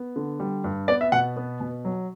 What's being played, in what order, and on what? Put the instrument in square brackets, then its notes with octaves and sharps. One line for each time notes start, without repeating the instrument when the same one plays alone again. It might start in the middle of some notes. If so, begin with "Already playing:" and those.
Already playing: [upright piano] B3
D3
G3
G2
B3 D5
E5
B2 F#5
B3
B2
F#3